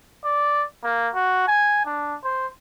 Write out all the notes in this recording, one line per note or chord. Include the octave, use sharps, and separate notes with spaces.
D5
A#3
F#4
G#5
D4
C5